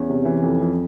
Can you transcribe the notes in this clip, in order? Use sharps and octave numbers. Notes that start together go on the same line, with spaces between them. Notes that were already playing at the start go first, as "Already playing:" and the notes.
Already playing: E2 C#4
C3
E3
F2
F2